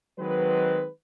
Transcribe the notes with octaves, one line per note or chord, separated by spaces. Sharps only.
D#3 F#3 G#3 C4 B4